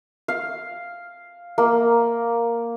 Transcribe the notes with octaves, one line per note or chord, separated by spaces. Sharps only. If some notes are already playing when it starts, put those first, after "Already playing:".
F5
A#3